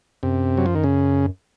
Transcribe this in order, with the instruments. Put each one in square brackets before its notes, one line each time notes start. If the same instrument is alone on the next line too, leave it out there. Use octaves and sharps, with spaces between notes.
[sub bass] F#2 [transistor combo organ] C3
[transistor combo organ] F#3
F3
D#3
C#3